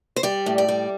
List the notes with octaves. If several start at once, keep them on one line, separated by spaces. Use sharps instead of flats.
C5
G3 D5
A2
D5
G3